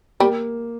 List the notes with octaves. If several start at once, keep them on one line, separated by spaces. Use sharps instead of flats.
G3 A#3